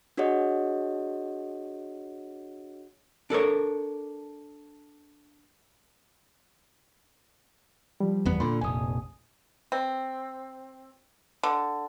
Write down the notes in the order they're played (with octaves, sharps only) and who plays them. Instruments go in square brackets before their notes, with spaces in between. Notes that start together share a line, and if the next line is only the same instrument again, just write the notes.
[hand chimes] D4 F#4 G#4 C#5 D#5 F#5
[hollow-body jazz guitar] D4 A4 A#4 C#5
[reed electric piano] F3 G3
[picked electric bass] F#1 E2 B3
[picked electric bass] A#2 D3 [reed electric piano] B5 C6
[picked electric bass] F1 A#1 [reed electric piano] G#5 D#6
[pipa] C4
D3